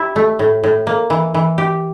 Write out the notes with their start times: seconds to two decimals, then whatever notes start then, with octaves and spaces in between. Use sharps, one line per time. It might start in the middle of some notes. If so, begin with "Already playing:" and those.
Already playing: E4 G4
0.16 A3
0.39 A2
0.63 A2
0.87 A#3
1.10 E3
1.34 E3
1.58 G4